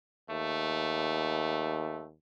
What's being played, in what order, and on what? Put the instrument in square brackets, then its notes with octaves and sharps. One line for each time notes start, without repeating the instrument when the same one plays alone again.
[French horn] D#2 [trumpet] A3